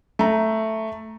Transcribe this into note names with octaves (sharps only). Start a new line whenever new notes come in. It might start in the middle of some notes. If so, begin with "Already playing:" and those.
A3 A#5